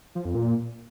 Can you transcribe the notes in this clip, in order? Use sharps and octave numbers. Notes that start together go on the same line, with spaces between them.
F3
F2
A#2